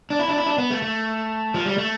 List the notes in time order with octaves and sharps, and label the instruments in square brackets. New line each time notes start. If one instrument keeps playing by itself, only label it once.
[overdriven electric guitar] D4
E4
D4
E4
D4
B3
A3
A3
F3
G3
A3